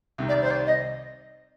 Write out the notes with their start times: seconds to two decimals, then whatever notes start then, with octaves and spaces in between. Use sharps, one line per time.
0.18 C2 C3 D#3
0.29 D5
0.42 C5
0.51 D5
0.66 D#5